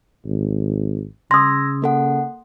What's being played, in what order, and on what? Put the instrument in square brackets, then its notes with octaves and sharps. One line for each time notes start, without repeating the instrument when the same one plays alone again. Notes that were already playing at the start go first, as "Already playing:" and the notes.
[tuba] G#1
[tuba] C#3 [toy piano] C6 D#6 [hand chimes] E6 G#6 A#6
[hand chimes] A#3 A4 F#5